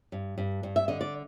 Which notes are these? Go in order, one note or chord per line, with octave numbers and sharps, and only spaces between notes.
G2
G2
G2
E5
D3 D#5
D5